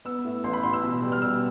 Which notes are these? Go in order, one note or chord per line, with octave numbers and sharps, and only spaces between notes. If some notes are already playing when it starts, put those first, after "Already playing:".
B3 E6
A2
A1 C6
B5
A1 C6
E6
B2
G3
F6
B2 E6